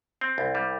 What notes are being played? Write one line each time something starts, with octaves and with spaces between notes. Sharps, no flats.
C4
C2
G3